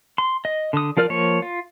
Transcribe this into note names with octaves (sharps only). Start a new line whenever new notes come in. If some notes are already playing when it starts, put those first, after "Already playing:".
C6
D#5
D3 D#6
F3 F4 A#4 D5 F6
F3 A#3 C#5
F4